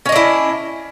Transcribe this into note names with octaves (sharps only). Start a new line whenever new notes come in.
C#4 D4 E4 D#5